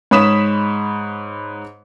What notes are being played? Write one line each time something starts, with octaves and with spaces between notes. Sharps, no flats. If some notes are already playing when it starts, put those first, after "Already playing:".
G#2 C#5 B5 D#6 B6 E7